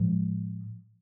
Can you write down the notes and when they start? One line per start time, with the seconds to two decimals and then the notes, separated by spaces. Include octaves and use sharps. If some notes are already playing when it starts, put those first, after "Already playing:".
Already playing: A2 F3 G#3